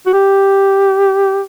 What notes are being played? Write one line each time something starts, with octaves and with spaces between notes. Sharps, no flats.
F#4
G4